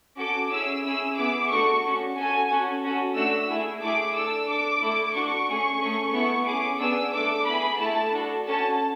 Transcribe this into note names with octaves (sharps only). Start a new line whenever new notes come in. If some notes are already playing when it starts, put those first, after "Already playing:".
C#4 F#4 A4 D6
C#4 E4 G#4 E6
C#4 E4 G#4 E6
B3 E4 G#4 D6
A3 D4 F#4 A4 C#6
C#4 F#4 A4
C#4 F#4 A4 G#5
C#4 F#4 A4
C#4 F#4 A4
A3 D4 F#4 A4 E6
A3 E4 G#4
A3 E4 G#4 D6
D4 A4 E6
D4 A4 D6
A3 E4 A4
D4 F#4 A4 C#6
A3 C#4 G#4
A3 C#4 G#4
B3 E4 A4 C#6
C#4 G#4 D6
B3 D4 G#4 E6
A3 D4 A4 D6
B3 E4 G#4 B5
A3 E4 A4 A5
D4 F#4 A4
C#4 F#4 A4 A5